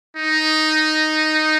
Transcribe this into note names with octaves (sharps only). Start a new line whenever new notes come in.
D#4